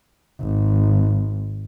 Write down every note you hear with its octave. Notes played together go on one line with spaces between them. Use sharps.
G#1